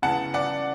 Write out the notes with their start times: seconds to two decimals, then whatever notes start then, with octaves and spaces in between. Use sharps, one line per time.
0.02 C#3 E3 B3 F#5 A5
0.34 D5 F#5